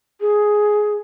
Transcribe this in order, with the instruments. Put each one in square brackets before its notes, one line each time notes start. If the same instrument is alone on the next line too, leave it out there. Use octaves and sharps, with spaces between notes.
[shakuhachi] G#4